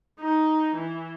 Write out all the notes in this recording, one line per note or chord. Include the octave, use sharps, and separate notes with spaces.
D#4
E3